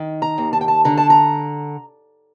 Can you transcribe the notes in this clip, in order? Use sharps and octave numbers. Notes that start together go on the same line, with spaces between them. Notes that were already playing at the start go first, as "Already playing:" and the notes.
Already playing: D#3
A#5
D#2
A5
G5
A5
D3 A#5
A5
A#5